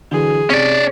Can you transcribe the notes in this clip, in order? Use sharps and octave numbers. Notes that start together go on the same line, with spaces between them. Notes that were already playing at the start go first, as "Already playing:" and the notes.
D3 E3 F#3 G#4
C3 C#4 D5